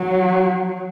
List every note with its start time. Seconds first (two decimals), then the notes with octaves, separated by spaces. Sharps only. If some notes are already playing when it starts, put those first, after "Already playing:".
Already playing: F#3